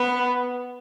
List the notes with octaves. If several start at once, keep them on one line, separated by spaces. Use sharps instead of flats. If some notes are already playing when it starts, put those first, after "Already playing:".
Already playing: B3